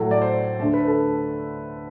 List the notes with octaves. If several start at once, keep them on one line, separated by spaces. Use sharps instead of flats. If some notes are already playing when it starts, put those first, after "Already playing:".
Already playing: A2 F#3 A3
D5
C5
D2 D3 A3 A4
B4
A4